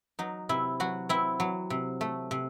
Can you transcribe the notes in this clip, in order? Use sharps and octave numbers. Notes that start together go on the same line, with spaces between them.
F#3 D#4
C3 E4
F#3 F#4
C4 E4
F#3
C3
A3
C3